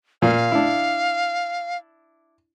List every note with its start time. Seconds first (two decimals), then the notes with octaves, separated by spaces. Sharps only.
0.22 A#2 F5
0.52 D4 E4